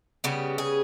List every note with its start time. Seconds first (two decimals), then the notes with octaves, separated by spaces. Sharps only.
0.24 C#3 G3 B3 G4
0.58 G#4